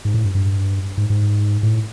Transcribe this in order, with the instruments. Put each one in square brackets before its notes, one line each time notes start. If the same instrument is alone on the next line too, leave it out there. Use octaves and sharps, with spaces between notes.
[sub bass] G#2
A2
G2
G2
G#2
G#2
A2